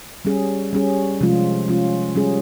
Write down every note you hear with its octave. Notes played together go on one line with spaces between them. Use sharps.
G3 C#4 G#4
G3 C#4 G#4
C3 F3 G#3 C#4 F4
C3 F3 G#3 C#4 F4
G3 C#4 G#4